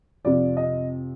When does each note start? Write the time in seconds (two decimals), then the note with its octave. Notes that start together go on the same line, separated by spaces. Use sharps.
0.25 F2 C3 F3 D5
0.57 D#5